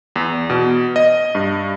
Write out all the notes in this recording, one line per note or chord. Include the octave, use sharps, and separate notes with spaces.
E2
B2
D#5
G2